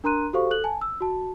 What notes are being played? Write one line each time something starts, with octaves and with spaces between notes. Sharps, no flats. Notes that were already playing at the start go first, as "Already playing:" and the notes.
D4 A#4 A#5 C6 F#6 D#7
F#4 G4 A4 C5 F5 C#6
A4 F#6 F#7
G#5 A5
E6
F#4 A5